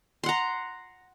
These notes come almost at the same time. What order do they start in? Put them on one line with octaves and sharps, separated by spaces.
C6 F#5 A#5